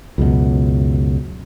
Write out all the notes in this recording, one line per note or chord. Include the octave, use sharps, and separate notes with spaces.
C#2 F#2 B2